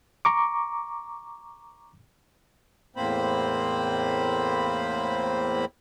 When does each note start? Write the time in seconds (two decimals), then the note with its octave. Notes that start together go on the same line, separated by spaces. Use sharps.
0.25 A#5 C#6 D6
2.96 E2 A2 A#3 C4 C5 B5